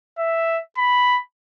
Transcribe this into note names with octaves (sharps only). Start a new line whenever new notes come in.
E5
B5